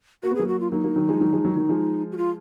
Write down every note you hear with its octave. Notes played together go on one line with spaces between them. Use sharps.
A#3 F#4
B3
F#3 A#3 G#4
F#4
F4
F#3 A#3 D#4
F#3 A#3
D#3 F#3
F3 G#3
D#3 F#3
F3 G#3
D#3 F#3
D#3 F#3
F3 G#3
F#4
F4